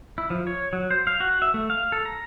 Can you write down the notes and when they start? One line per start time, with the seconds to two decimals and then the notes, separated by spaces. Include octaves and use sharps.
0.18 E4
0.30 F3
0.47 C#5
0.73 F#3
0.91 C5
1.07 F5
1.20 F#4
1.42 E5
1.54 A3
1.70 F5
1.92 A4
2.06 A#5